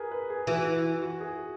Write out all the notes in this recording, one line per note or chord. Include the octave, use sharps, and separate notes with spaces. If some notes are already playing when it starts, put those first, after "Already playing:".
Already playing: G#4 A#4 B4
B4
G#4
E3 F#4
E4
E4
F#4
G#4